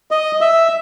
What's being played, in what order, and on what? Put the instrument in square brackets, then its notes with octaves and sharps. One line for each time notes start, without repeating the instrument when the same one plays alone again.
[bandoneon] D#5
E5